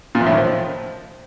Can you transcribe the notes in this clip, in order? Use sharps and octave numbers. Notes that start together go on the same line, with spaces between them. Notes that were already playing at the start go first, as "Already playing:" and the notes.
A#2
E2
A2
D#3
F3